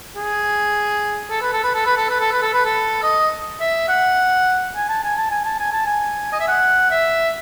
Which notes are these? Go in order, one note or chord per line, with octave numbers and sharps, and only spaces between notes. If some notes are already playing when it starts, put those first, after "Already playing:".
G#4
A4
B4
A4
B4
A4
B4
A4
B4
A4
B4
A4
B4
A4
D#5
E5
F#5
G#5
A5
G#5
A5
G#5
A5
G#5
A5
G#5
D#5
E5
F#5
E5